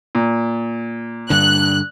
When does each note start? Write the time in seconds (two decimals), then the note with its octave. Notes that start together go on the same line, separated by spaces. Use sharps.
0.15 A#2
1.30 G2 D3 F#6